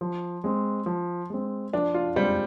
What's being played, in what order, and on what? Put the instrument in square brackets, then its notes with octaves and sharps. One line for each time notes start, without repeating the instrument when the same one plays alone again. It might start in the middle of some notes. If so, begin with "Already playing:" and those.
[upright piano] F3
G#3 C4
F3
G#3 C4
[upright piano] F3 [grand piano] D4
[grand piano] F4
[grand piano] G3 [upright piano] G#3 C4